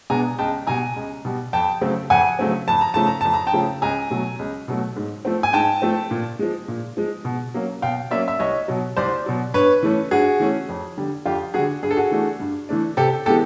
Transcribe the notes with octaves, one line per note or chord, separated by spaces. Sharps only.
B2 G#3 B3 D4 G#5 A#5
C#2 G5 A5
B2 G3 G#5 A#5
C#2
B2 G3
F2 G5 A5
C#3 F#3 A3 C4
F2 F#5 G#5
C#3 F#3 A3 C4
F2 A5
A#5
C#3 F3 A3 A5
A#5
F2 A5
A#5
G5 A5
C#3 F3 A3
C#2 G#5 A#5
B2 F#3 A3
C#2
B2 F#3 A3
G#2
F3 A3 C4
G#5
G#2 G5 A5
F3 A3 C4
A#2
F3 G#3
A#2
F3 G#3
B2
F#3 A#3 C#4
B2 F5 G5
F#3 A#3 C#4 D5 E5
E5
C2 C#5 D#5
B2 F#3
C2 C5 D5
B2 F#3
G2 B4 C#5
E3 A3 C#4
G2 F#4 G#4
E3 A3 C#4
F2
D3 G3
F2 F4 G4
D3 G3 F#4 G#4
G2 G#4
A4
F#4 G#4
E3 A3 D4
G2
E3 A3 D4
C3 G4 A4
E3 G#3 B3 G4 A4